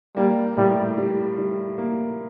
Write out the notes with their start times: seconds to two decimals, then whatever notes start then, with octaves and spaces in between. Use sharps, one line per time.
0.17 G3 A#3
0.57 A2 G3
0.97 G3
1.38 G3
1.78 A#3